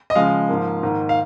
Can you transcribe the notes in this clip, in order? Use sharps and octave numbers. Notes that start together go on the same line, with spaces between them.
D#5
C#3 F3 G#3 F5
G#2 F3 A#3
G#2 D#3 A#3
F5